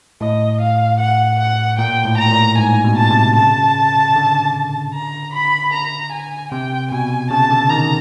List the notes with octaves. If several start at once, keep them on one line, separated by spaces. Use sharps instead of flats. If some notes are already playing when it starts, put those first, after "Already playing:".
A2 D#5
F5
F#5
F#5
A#2 G5
A2
A#5
A2
A#2
G#2 G#5
B2
A5
C3
C#3 A5
D3
A#5
B5
A#5
G#5
C3 G5
B2 G#5
C#3 A5
D3
D#3 A#5